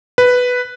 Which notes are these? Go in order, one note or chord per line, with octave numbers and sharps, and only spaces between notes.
B4